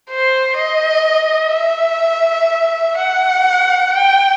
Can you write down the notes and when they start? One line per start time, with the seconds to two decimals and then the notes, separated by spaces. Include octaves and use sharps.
0.10 C5
0.58 D#5
1.54 E5
2.98 F#5
3.93 G5